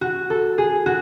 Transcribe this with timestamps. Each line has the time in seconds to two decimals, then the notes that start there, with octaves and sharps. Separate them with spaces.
0.01 F#4
0.30 A4
0.58 G#4
0.86 F#4